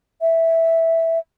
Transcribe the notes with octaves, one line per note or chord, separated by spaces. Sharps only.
E5